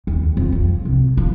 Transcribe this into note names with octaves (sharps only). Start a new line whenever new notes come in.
D#2
F2
F3
C2
F3